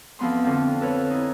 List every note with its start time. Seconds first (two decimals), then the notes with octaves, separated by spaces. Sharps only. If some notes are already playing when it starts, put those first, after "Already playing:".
0.19 F2 E3 F3 B3 B5 C6
0.44 D3 F3 C4
0.81 A4 B4 C#5
1.10 D#4 E4